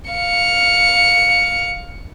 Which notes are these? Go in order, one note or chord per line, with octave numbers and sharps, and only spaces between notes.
F5 C#7